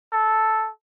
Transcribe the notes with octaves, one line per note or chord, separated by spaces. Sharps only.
A4